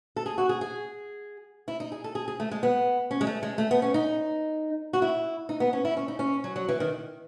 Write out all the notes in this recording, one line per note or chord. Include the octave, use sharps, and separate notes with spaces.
A4
G#4
F#4
G#4
G#4
E4
D#4
G#4
A4
G#4
G#4
A3
G#3
B3
C#4
G#3
A3
G#3
A3
B3
C#4
D#4
F#4
E4
D#4
B3
C#4
E4
C#4
D#4
C#4
F#3
F#3
E3
D#3